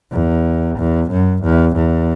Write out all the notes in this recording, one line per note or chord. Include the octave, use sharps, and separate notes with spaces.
E2
E2
F#2
E2
E2